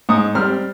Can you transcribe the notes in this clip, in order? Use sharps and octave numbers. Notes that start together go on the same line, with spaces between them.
G#2 D#6
G3 C4 F6